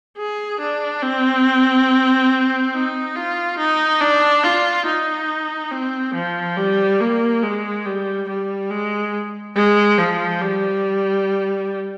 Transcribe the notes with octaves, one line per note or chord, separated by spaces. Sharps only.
G#4
D4
C4
D#4
F4
D#4
D4
F4
D#4
C4
F3
G3
A#3
G#3
G3
G3
G#3
G#3
F3
G3